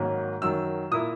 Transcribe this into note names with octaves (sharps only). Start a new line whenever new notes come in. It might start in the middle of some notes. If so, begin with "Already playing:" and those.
Already playing: G#2 D#3 F#3 A#3 C#4
F#2 D#3 F#3 E6
A#2 A#3 E4 D#6